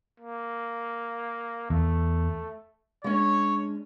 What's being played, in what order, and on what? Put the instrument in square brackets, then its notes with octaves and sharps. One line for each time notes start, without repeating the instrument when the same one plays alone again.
[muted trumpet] A#3
[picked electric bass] E2 [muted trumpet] A3
[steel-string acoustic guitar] G#3 C#4 D4 [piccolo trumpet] C#5